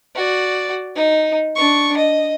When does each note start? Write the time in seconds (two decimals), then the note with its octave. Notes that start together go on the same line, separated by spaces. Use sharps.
0.15 F#4 D5
0.96 D#4
1.56 D4 C#6
1.97 D#5